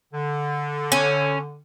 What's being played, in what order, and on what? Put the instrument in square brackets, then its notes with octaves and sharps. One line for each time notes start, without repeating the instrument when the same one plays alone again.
[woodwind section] D3
[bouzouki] C#4